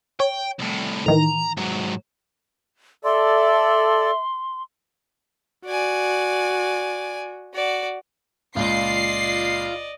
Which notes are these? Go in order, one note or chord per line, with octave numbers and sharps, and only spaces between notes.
C#5 G5
C2 A2
A2 D#3 E3 A#5
G#2 F#3
A4 D5 E5 C6
F#4 D5 G#5
F#4 D5
C#2 A#2 F4 D5 D#5 C7